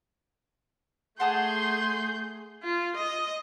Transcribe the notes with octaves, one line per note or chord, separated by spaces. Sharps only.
A3 G#4 F#5 A5 C6 D#6 G6
F4
D#5